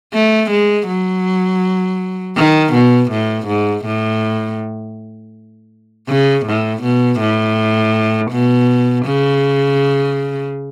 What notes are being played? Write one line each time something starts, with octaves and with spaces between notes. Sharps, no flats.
A3
G#3
F#3
D#3
B2
A2
G#2
A2
C#3
A2
B2
A2
B2
C#3